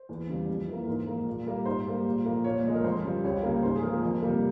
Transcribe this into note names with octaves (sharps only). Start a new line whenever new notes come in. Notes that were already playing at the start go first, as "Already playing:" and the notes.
Already playing: C5
E2
C#3 G3
F2
E3
A#3
G#2 A#4
F3 A#3
A#2
G3 A#3
G#2 C5
G3 A#3
A#2
F3 A#3
A#2 C#5
F3 G#3
A#4
F2 C5
C#3 G3
C#2 C#5
C#3 G3 A#3
G#2 C5
G#4
F3 A#3 A#4
F2
C3 G3 A#3